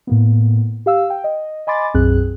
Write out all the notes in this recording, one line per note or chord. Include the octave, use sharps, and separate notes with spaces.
A2 A#3 B3
G4 F5 E6
G5
D#5
D#5 G#5 B5 C6 D6 A6
B1 F#2 C4 G#4 F#6